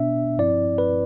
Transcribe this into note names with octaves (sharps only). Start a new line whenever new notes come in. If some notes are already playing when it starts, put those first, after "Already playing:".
Already playing: B2 B3 D4 E5
G2 F3 C4 E4 D5
B4